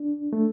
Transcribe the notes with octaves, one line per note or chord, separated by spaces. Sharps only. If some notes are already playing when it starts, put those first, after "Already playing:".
Already playing: D4
A3